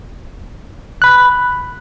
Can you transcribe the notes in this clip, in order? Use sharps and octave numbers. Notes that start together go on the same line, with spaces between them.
B5 F#6